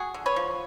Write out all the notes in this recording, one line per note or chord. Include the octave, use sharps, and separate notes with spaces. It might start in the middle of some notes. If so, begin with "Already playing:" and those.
Already playing: F#4 G#4
D3
B4 C#5
F3